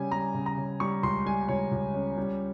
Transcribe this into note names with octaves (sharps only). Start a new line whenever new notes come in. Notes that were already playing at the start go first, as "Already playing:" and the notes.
Already playing: C#3 G3 C#4 G#5
G3 A#5
C#3
A#5
C#3
G3 C#6
C#2 C6
G3 G#5
C#2 C#5
C#2
C#4
G3